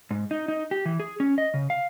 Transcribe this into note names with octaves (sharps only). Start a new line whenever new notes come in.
G#2
D#4
D#4
G4
E3
G#4
C#4
D#5
C#3
F5